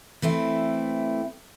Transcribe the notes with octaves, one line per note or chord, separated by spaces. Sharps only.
E3 A3 C4 E4